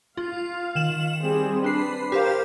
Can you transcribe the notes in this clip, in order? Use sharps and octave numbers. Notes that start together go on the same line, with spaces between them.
F4 F5
D#3 E7 F#7
G3 C4 G#4
D4 B4 C7
G4 A#4 C5 F5